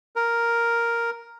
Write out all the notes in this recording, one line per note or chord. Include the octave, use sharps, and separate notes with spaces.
A#4